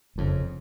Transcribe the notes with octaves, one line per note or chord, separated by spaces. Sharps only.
F#1 F2 C#3